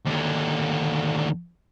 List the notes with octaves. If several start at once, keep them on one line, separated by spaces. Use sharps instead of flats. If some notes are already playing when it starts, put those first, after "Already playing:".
D#2 D3